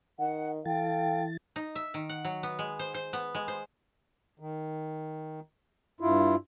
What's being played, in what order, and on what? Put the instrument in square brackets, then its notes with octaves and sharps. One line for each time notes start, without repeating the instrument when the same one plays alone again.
[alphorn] D#3 [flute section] F#5
[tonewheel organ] E3 E4 A6 [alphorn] A4 [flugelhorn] F5 [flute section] G5
[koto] D#4
E5
D#3
F#5
F#3
B3
G#3
C5
C5
B3
G#3
C5
[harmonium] D#3
G2 E4 F4